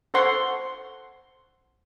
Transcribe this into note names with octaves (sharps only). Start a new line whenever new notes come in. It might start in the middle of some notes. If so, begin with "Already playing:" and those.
A4 C5 F#5 C6 C#6